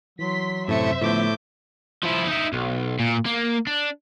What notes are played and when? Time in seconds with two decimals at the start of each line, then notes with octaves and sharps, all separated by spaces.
0.19 E3 F#3 C6 B6
0.68 F#2 A2 C3 A3 C5 E5 C#7
1.02 A2 D3 F3 A3 B3 D6 G6
2.03 F3 E4
2.27 D#4 E4
2.53 B1
3.00 A#2
3.26 A#3
3.67 D4